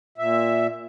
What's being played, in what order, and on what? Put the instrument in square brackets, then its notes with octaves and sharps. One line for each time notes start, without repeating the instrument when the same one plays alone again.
[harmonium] A#2 E5